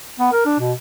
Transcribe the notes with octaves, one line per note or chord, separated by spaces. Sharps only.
B3
A#4
D4
B2